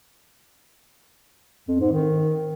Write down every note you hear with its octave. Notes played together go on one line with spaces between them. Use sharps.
F2
G#2
D#3